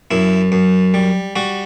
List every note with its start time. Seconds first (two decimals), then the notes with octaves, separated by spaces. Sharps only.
0.11 F#2 E4
0.52 F#2
0.94 G3
1.36 G3 F#4